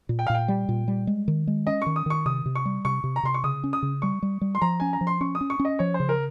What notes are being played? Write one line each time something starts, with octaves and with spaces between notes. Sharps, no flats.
A#2
G5
F5
A#2 G5
G3
A#2
G3
G#3
D#3
G#3
C#4 D#5
D#3 C#6
D#6
D#3 C#6
C3 D#6
C3
C#6
G3
C3 C#6
C3
A#5
C3 C6
C#6
C#3 D#6
C#4
D#6
C#3
G3 C#6
G3
G3
C6
F3 A#5
C#4 G#5
A#5
F3
C6
C#4 C#6
D#6
C#4
C#6
C#4
D#5
F3 C#5
C5
C#3
A#4